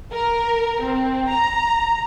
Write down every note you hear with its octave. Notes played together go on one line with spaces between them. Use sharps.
A#4
C4
A#5